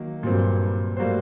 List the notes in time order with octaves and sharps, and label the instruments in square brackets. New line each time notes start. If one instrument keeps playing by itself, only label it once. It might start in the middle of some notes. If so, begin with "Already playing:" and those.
Already playing: [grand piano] D#3 F#3 A#3
[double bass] G2 [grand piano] A#2 F#3 C4
[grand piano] A2 G3 A#3 F#4 C5